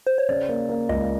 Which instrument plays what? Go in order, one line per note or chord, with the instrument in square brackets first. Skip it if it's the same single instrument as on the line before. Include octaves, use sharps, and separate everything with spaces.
[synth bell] C5
C#5
[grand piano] C#3 [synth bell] D5
[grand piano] A#3
A#3
[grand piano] C#2 [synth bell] D#5